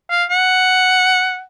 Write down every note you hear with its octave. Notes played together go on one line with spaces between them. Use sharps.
F5
F#5